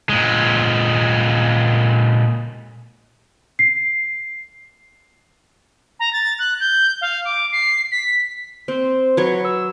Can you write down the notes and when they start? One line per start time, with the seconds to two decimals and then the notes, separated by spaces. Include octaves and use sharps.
0.09 A#2 G#3
3.59 C7
6.00 A#5
6.13 A6
6.39 F#6
6.60 G6
7.01 F5
7.25 D6
7.52 C7
7.92 B6
8.68 C4 C5
9.17 F#3 B4 C#5
9.45 E6